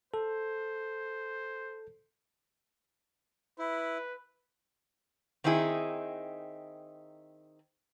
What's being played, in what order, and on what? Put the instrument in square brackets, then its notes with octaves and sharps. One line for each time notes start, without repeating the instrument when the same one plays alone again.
[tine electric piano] A4 [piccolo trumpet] C5
[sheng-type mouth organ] E4 [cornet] B4
[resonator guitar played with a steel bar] D#3 C4 D#4 E4 G#4